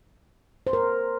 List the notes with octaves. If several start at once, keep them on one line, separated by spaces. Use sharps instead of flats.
C5
A#4